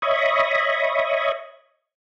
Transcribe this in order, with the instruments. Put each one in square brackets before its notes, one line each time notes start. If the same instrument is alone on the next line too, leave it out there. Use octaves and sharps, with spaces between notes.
[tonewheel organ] C#5 D#5 E5 B5 C#6 D#6